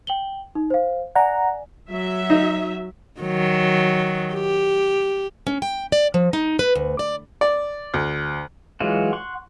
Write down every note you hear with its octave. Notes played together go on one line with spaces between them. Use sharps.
G5 F#7 G7
D#4
C5 F5
D5 F#5 G#5 A#5
F#3 E5
D#4
D#3 F#3
G4
C#4
G5
D5
F3
D#4
B4
D2
D5
D5
D2
E3 F#3 G#3 F4 F#4
F#5 C6 C#6